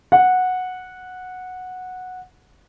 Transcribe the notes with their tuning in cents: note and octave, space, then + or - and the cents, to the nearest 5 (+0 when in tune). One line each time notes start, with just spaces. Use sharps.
F#5 -10